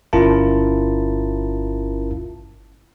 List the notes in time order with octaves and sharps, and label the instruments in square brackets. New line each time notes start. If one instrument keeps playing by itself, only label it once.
[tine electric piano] G1 C#4 E4 F4 A#4 A5